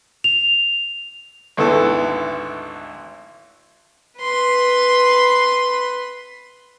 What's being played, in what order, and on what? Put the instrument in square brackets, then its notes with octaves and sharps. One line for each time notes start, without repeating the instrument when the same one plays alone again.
[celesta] F7
[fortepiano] G#1 D2 B3 E4 A4
[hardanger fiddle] B4 C6